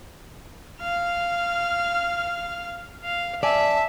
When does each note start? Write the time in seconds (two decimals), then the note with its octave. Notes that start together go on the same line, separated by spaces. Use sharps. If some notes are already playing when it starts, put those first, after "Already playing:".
0.80 F5 F6
3.04 F5
3.42 F#2 D5 E5 G#5 A5